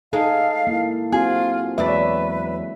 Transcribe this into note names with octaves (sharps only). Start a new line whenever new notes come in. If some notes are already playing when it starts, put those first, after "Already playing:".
G#3 D#4 A4 F5
A#3 E4
C4 F4 F#4 G#4
E2 F#3 G#3 B4 D5 E5